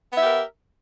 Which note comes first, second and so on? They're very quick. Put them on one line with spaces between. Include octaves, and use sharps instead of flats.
B3 E5 G4 A#4